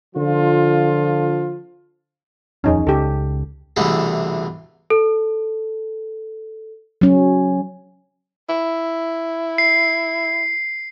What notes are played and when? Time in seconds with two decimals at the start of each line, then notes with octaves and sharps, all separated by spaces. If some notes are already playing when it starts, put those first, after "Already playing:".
0.16 D3 F3 F4
2.64 D#1 F2 C#4 D#4 G#4
2.87 C#2 G4 A4
3.76 C2 B2 D3 E3 A3 G#4
4.90 A4
7.01 F#3 C#4
8.49 E4
9.58 C7